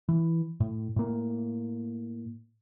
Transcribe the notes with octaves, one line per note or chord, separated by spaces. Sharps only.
E3
A2
A2 A#3